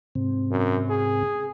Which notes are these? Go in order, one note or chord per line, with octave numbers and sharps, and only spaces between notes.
G#2 C3 C4
F#2
G#4